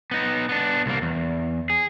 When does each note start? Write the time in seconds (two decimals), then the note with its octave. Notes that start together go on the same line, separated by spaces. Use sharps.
0.11 B3 D#4
0.49 B3 D4
0.86 C2 A#3
1.02 E2
1.70 G#4